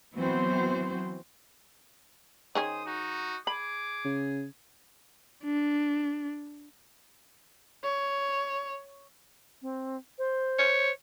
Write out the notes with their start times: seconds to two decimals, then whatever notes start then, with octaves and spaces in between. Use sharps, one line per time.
0.17 E3 F#3 B3 C4 F#4 C5
2.55 D#3 C#4 G#4 C5 D#6
2.86 D#4 F#4
3.47 G#4 B5 D6
4.05 C#3
5.44 D4
7.83 C#5
9.62 C4
10.18 C5
10.59 C#5